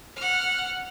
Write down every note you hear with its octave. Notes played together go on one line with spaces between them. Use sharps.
F#5 F6